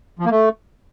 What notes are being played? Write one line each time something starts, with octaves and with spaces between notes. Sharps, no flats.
F3
A#3
A3